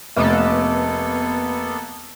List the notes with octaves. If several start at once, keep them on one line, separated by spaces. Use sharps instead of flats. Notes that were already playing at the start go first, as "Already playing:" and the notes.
F1 A#3 B3 A4